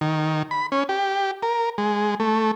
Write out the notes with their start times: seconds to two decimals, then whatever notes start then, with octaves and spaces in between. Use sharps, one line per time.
0.01 D#3
0.51 B5
0.72 C#4
0.89 G4
1.43 A#4
1.78 G#3
2.20 A3